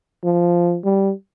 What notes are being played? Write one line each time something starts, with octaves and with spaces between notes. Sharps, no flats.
F3
G3